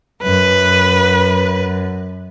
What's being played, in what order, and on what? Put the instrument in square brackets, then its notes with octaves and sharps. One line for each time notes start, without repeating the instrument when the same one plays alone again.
[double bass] F#2 [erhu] B4